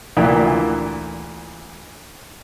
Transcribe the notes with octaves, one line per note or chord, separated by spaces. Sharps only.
D2 A#2 E3 E5 G5